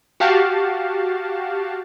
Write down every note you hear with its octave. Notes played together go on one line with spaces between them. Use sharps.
F#4 G4 F5 A5